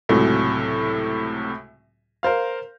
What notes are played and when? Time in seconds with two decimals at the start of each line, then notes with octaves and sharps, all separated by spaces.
0.09 C#2 A2 C3 F#3
2.23 A#4 C5 F5